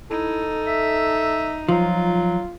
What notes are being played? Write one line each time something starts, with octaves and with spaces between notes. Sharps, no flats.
D#4 E4 A4
E5
F3 F#3 F4